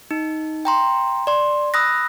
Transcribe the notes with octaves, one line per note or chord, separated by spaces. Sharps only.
D#4
G5 A#5 C6
D5 C6
B5 D#6 E6 F#6 A#6